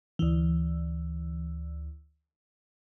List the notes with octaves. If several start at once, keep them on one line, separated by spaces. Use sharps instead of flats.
D2 E3